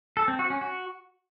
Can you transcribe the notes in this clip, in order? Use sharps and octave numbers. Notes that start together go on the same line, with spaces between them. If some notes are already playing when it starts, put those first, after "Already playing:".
A4
C4
F#4
C#4
F#4